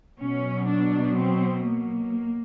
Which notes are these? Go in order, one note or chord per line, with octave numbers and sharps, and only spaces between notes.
B2 F#3 C#4
D4
C4
A#3